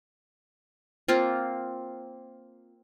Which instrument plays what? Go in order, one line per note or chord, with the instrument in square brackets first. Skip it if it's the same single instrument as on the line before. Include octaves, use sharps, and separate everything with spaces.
[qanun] A#3 C4 F4